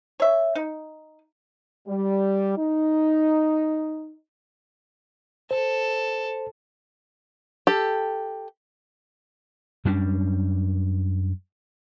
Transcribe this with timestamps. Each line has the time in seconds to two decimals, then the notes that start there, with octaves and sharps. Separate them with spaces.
0.20 C#5 E5
0.55 D#4
1.87 G3
2.57 D#4
5.51 A4 C5
7.67 G4 A4
9.85 F#2 G3 C#4 D4